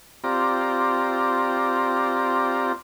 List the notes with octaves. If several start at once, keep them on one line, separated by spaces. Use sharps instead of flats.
C4 F4 G4 D5 A#5